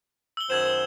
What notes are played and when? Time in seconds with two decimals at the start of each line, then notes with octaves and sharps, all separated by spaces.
0.37 E6 G7
0.50 F#2 D#3 C5 E6 G#6 E7